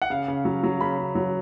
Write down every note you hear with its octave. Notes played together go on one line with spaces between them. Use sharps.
F#5
C#3 F5
C#3
F#3
F#3
C#3 B5
C#3
F#3